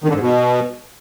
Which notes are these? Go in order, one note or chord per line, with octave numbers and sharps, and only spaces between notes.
D#3
D3
G#2
B2